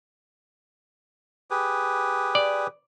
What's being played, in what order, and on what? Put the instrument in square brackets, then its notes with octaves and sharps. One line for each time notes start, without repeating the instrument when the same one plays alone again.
[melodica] G4 G#4 B4
[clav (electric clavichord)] D5